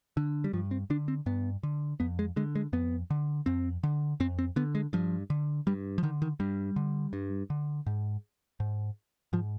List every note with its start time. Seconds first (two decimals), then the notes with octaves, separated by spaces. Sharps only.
0.17 D3
0.44 G3
0.53 G2 F3
0.71 C4
0.90 D3 D4
1.08 C4
1.26 G2 B3
1.63 D3
2.00 F2 B3
2.19 G#3
2.36 D3 G#3
2.55 G#3
2.73 F2 B3
3.10 D3
3.46 F2 C4
3.83 D3
4.20 F2 C4
4.39 C4
4.56 D3 B3
4.75 G#3
4.93 G2 F3
5.30 D3
5.67 G2 G3
5.98 F3
6.03 D3 D#3
6.22 D#3
6.40 G2 G3
6.76 D3
7.13 G2
7.50 D3
7.87 G#2
8.60 G#2
9.33 G#2 F3